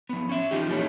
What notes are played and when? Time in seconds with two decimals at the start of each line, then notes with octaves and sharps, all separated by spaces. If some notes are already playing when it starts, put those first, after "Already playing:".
0.09 F3 B3
0.29 C#4 E5
0.51 E3 F3 D#4 G4
0.70 A#2 E3 A3 A#3 C#4 D#4